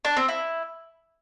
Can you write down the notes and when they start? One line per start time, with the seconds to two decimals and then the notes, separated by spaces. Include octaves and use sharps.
0.05 D4
0.17 C4
0.28 E4